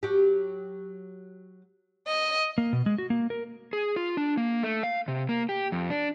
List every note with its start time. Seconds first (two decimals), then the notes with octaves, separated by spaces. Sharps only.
0.03 F#3 G4
2.07 D#5
2.58 A#3
2.73 B2
2.86 G#3
2.98 F#4
3.10 A#3
3.30 A#4
3.73 G#4
3.96 F4
4.17 D4
4.37 A#3
4.63 A3
4.83 F5
5.08 C3
5.29 A#3
5.49 G4
5.72 F2
5.90 D4